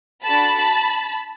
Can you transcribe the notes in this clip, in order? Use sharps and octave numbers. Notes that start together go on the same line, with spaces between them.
D4 F#4 A4 A5 B5